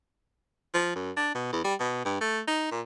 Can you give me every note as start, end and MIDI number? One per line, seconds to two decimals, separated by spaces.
0.74 0.92 53
0.95 1.12 42
1.17 1.32 62
1.35 1.49 47
1.52 1.60 40
1.64 1.74 55
1.80 2.02 47
2.05 2.19 43
2.21 2.41 57
2.47 2.67 63
2.72 2.81 46